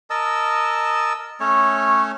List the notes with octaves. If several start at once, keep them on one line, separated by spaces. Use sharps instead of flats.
A#4 D#5 A5 E6
A3 C#4 C#5